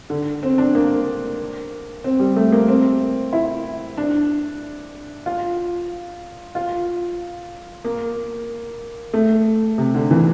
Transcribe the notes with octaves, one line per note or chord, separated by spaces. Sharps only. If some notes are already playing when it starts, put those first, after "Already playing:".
D3
C4
D4
A#3
C4
G3
A3
A#3
C4
E4
D4
F4
F4
A#3
A3
C3
D3
E3